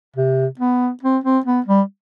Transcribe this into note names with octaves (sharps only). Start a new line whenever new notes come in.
C3
B3
C4
C4
B3
G3